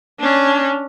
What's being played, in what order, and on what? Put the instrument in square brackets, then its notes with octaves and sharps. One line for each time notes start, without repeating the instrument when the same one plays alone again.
[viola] C#4 D4